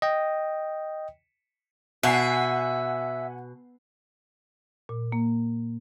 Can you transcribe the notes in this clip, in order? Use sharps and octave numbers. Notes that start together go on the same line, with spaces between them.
D#5 G5
B2 E5 F#5 G#5 C7
A#2
A#3